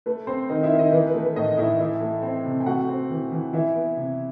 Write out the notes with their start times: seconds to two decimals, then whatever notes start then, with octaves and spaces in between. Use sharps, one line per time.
0.06 A3 B4
0.27 C4 C5
0.49 D#3 D#4 D#5
0.63 E4 E5
0.72 D#3
0.79 D#4 D#5
0.92 E3 B4
1.07 B4
1.14 A3
1.22 B4
1.36 A2 D#4 D#5
1.58 A2 E4 E5
1.80 E3 E4 E5
2.01 A3
2.23 C4
2.45 C3
2.60 G5
2.66 A3 F#4 F#5
2.89 C4
3.10 E3
3.32 E3
3.53 E3 E4 E5
3.75 B3
3.97 C3